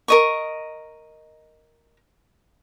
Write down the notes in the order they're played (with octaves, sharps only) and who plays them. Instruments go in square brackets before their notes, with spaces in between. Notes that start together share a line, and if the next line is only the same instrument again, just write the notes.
[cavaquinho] A#4 D#5 C#6